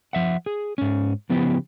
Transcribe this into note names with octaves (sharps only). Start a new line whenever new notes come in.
F3 E5 F#5
G#4
G#2 C#4
C#3 F3 B3 E4 G4